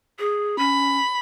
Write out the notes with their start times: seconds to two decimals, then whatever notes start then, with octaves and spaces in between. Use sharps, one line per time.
0.19 G#4
0.59 C#4 B5